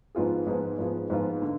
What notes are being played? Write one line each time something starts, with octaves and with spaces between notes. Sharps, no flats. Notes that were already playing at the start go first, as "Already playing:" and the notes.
G#2 F3 B3 F4 G#4
G#2 F3 B3 F4 G#4
G#2 F3 B3 F4 G#4
G#2 F3 B3 F4 G#4
D3